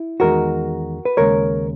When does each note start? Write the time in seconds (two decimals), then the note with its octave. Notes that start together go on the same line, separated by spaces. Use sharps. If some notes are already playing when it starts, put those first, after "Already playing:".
Already playing: E4
0.20 E2 D#3 G#3 F#4 A#4
1.05 B4
1.17 D#2 C#3 G#3 A#4 C#5